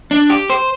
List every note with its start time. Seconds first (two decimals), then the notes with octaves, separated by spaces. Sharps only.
0.11 D4
0.30 G4
0.50 C5